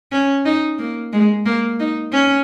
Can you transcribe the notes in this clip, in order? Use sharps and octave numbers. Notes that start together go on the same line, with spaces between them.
C#4
D#4
A#3
G#3
A#3
D#4
C#4